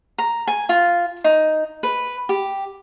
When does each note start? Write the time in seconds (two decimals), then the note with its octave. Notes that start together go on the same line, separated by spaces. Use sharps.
0.18 A#5
0.47 G#5
0.69 F4
1.24 D#4
1.83 B4
2.29 G4